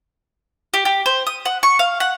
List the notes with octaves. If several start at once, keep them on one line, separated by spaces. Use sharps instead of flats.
G4
G4
C5
D#6
F#5
C#6
F5
F#5